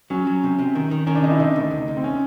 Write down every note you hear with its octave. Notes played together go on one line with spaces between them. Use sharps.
F#3 C#4
F#3
C3
C3
D#3
D#3
D#3 C#4
D4
C3 D#4
E4
C3 D#4
D2
D2
D2
C4
C#4